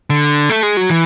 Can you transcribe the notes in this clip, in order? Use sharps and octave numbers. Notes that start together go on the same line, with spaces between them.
D3
A3
G#3
F#3
E3